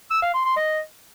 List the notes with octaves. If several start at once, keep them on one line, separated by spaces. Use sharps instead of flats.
E6
F5
C6
C6
D#5